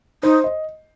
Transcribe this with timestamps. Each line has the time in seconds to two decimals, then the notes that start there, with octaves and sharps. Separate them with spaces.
0.23 D#4 C5
0.44 D#5